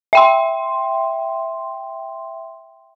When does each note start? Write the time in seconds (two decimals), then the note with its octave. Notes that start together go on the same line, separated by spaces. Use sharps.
0.13 E5 G5 C6